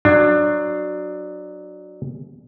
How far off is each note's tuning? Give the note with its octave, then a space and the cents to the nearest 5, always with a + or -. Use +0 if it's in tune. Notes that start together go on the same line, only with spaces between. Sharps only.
F#3 +0 D4 +20